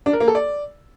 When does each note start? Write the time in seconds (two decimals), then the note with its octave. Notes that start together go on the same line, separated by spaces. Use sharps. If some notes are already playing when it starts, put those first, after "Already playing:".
0.06 D4
0.13 A#4
0.20 A#3
0.28 A4
0.35 D5